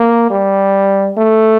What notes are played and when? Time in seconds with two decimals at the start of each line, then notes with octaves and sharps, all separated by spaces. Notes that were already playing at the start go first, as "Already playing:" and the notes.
Already playing: A#3
0.30 G3
1.18 A3